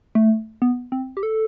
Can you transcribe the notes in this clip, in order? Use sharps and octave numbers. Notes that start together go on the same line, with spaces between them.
A3
B3
C4
G4
A4